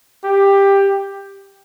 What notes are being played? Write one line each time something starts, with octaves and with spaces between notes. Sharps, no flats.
G4